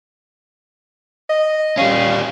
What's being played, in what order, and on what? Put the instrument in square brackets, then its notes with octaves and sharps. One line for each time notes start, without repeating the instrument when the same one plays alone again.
[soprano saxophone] D#5
[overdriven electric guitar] G3 C#4 [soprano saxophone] F5